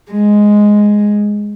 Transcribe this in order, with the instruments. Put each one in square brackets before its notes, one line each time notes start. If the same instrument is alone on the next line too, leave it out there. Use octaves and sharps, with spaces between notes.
[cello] G#3